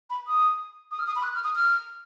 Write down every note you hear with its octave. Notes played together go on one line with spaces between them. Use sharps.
B5
D#6
D#6
F6
D#6
B5
F#6
F6
D#6
F6